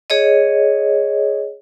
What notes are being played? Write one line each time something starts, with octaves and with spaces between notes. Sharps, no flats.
G#4 C#5 D#5